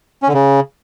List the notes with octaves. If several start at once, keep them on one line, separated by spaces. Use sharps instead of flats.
C#4
D3
C#3